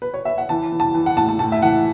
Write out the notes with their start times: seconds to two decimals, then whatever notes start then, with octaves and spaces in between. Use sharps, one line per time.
0.02 B4
0.14 C#5
0.25 E5
0.38 F#5
0.49 E3 A5
0.72 E3
0.80 A5
0.95 E3
1.06 F#5
1.17 A2 A5
1.29 A5
1.39 A2 A5
1.52 E5
1.62 E3 F#5